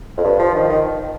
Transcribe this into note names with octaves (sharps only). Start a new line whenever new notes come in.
F2
G2
F3
D#3
D#3